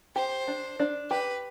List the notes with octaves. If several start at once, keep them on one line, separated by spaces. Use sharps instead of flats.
G4 C5
D4
D4
G4 B4